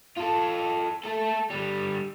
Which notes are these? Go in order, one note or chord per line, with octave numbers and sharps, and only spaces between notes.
F4 A4
A3 A4
D3 G3